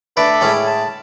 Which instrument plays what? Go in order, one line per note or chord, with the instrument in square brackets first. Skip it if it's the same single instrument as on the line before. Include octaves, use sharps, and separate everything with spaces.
[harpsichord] A3 D4 B4 [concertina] A4 B5 D6
[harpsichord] A2 G#3 C#4
[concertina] A5